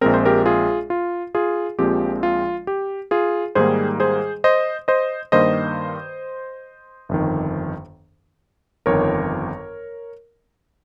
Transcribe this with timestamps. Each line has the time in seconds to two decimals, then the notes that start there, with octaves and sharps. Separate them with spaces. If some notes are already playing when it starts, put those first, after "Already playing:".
0.01 A#1 A#2 G#3 C4 A#4
0.14 C5
0.25 G4 A#4
0.46 F4 G#4
0.90 F4
1.35 F4 G#4
1.79 A#1 A#2 F3 G#3 C4 G4
2.23 F4
2.67 G4
3.11 F4 G#4
3.55 G#2 D#3 G3 A#3 G#4 C5
4.00 G#4 C5
4.44 C5 D#5
4.88 C5 D#5
5.32 G2 D#3 A#3 C5 D#5
7.09 G1 F2 D#3
8.86 G1 F2 D#3 A#4 C#5